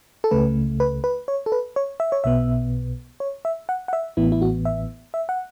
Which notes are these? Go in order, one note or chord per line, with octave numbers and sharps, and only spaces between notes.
A4
C#2 C#3 A3 B4
B4
B4
C#5
A4
B4
C#5
E5
C#5
B1 B2 B3 E5
C#5
E5
F#5
F#5
E5
A1 A2 E3 B3 E4
E4
F#4
E5
E5
F#5